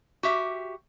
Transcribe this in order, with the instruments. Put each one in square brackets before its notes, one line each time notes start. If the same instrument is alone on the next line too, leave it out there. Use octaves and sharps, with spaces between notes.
[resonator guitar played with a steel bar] F#4 G4 E5